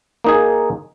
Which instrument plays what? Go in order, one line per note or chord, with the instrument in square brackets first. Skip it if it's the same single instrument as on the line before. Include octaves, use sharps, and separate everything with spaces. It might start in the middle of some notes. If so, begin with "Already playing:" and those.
[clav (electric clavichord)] A#3 D#4 G#4